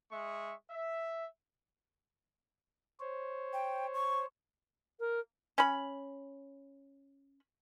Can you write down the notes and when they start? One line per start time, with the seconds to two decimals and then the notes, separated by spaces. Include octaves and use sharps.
0.10 G#3 E5 C#6
0.69 E5
3.00 C5 C#5
3.53 G5
3.94 C#6
4.99 A#4
5.58 C#4 B5